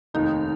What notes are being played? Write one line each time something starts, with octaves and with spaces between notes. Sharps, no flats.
F1 D#2 D#3 D#4